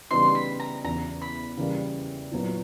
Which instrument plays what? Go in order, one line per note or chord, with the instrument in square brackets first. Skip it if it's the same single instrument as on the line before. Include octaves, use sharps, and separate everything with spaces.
[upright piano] C#3 E3 G3 B3 D#4 [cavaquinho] C6
[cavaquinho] B5
A#5
[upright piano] E2 C#3 E3 [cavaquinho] A#5
[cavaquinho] B5
[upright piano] C#3 E3 G3 A#3
A#2 F#3 B3 E4